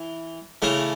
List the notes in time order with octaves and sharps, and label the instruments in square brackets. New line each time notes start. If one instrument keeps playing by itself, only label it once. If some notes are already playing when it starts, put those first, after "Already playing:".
Already playing: [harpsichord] E3
C#3 E3 A3